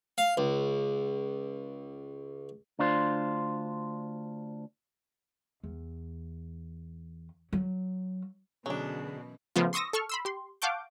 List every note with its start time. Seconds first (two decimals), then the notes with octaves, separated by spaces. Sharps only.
0.18 F5
0.37 C#2
2.79 D2 D4 F4 C5
5.64 E2
7.53 F#3
8.66 F#2 B2 D3 E3 F#3 C#4 D4 G#4
9.56 C#3 F3 A3 B3 F4
9.73 C6 C#6 D#6 E6 A#6
9.93 A4 C#6 F6
10.09 B5 C6 E6
10.25 G4 C6
10.62 F5 F#5 A5 C#6 D6 G6